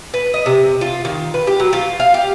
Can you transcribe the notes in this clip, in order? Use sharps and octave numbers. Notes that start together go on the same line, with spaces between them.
B4
D#5
C3
F4
D#3
B4
G4
F#3
F4
F5
G4